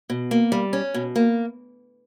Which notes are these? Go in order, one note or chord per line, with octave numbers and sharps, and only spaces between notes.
B2
A#3
G3
C#4
B2
A#3